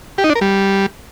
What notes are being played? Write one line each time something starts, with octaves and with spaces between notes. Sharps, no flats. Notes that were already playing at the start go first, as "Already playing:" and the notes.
G4
D#4
D4
A#4
G3